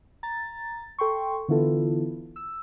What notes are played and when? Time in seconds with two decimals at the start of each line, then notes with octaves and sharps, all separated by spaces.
0.23 A#5 A6
0.98 A4 G5 C6 C#6
1.48 D3 E3 B3 E4 F4 A4
2.36 E6